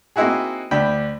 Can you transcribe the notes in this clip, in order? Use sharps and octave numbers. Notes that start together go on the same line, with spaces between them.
A#3 C4 D#4 E4 F#4 G#4
D2 D4 G5 B5